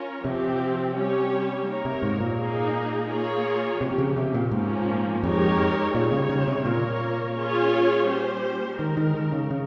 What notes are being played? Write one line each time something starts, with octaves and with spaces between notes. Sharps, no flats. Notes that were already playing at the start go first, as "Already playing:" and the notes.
Already playing: C#4 F4 A#4 C#5
C3 F3 C4 G4
G3 C#4 G4 C#5
A#3 D#4 G4 A#4 C#5
C3
G#2
A#2
A#3 D#4 G#4
A#3 F4 G#4 C#5
C3 F3 A#3 C#4 G4
C#3
C3
A#2
G#2 F3 A#3 C#4
F2 G#3 D#4 G4 A#4 C#5
A#2 G3 C4 D#4 G#4 C#5
C#3
C#3
C3
A#2 A#3 F4 A#4 C#5
C#4 F4 G#4 C#5
G3 C#4 G4 C5
D#3 G#3 D#4 A#4
D#3
D#3
C#3
C#3